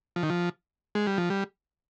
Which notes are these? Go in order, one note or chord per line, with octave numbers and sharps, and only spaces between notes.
F3
D#3
F3
G#3
G3
F3
G3